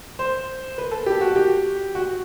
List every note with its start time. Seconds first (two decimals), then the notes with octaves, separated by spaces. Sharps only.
0.19 C5
0.78 B4
0.91 A4
1.06 G4
1.21 F#4
1.36 G4
1.95 F#4